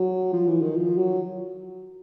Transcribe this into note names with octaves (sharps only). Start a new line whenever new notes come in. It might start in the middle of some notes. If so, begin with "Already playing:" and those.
Already playing: F#3
F3
E3
D#3
F3
F#3